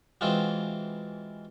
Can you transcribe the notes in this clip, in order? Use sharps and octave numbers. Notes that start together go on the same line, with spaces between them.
E3 G#3 C4 F4 F#4